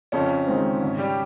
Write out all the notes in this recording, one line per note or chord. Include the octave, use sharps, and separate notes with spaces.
F2 C#3 C#4
D#3 G#3 C4
G#1
G3 G4